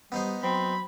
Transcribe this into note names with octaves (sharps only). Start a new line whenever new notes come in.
G3 B3 D#4 C5
F#3 C4 B5